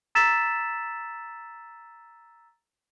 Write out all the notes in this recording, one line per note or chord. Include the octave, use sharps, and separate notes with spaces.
A#5 E6 A6 B6 E7